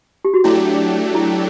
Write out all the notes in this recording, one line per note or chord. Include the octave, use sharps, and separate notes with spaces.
G4
F#4
F#3 A3 D4 E4 G4
E4